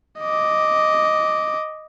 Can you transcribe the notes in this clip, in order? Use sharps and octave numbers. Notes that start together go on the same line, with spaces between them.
D#5 D6